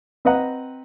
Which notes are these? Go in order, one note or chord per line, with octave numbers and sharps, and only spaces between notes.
C4 B4 D#5 F#5 A#5